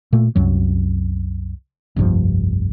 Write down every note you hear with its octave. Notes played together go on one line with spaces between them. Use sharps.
A#2 A3
C2 F#2 F#3
F1 C2 G2 F3